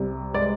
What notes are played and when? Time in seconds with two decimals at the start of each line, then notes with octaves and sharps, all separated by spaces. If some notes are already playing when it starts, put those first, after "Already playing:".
Already playing: C2 C3
0.34 G#3 D5